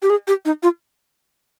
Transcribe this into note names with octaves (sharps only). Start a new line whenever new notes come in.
G4
G#4
G4
D#4
F4